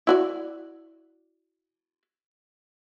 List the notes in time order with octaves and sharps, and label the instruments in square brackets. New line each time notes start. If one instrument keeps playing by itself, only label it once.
[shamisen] E4 F#4 D5